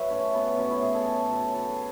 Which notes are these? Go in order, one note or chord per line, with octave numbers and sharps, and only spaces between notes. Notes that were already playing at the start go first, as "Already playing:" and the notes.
Already playing: F#3 B4 E5
A2 C#4
F#3 B3
F#3 C#4
E4
A2 G#4
A4
A2
F#3
F#3 A4
G#4